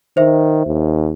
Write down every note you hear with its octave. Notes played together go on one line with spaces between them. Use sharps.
D#3 C5 E5
D#2